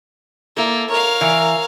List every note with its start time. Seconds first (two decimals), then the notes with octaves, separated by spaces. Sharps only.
0.57 A#3 E4 A4
0.90 A#4 C#5 F5
1.21 E3